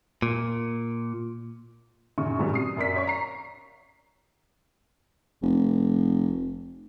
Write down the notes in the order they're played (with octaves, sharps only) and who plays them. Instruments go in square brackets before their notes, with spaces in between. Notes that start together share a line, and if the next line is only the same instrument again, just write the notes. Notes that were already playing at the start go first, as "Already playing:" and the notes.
[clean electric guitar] A#2
[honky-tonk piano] F#2 A#2 C#3 C#6
G2 A#2 C#3 F#3 G#3
C3 D#6 C7
F#2 A#4 D5 B6
C#5 D5 C#6
A#5 C7
[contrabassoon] F1